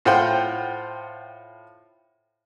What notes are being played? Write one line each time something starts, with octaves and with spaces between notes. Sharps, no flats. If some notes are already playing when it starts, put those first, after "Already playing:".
A2 F4 C5 F#5 G5 C6